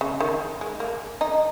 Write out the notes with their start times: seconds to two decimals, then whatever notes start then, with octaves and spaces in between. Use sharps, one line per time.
0.01 C#3
0.20 D#3
0.61 G#3
0.80 A#3
1.21 D#4